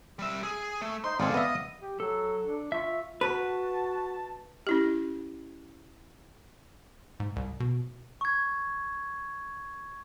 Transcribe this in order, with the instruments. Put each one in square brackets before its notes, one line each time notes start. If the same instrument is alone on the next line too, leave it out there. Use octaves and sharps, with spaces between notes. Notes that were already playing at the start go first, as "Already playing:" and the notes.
[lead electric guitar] G3 E5
G#4
A3
[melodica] D#4 C5 [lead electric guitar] C6
[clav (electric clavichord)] G#1 C4 [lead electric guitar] G#4 A4 [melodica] D5 F5
[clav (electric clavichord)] B3 E5 [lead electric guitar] D#5
[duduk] G4
[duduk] F#3 [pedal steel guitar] A4
[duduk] D4
[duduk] F4 [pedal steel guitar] E5 C#6
[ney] F#4 [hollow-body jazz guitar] B4 [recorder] A5
[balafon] C#4 E4 G4
[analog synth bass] G#2
C2
B2
[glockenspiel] C#6 G#6